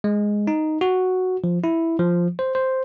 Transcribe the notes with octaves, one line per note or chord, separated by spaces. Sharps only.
G#3
D#4
F#4
F3
E4
F3
C5
C5